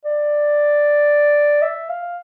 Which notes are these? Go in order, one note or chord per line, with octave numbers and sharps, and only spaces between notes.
D5
E5
F5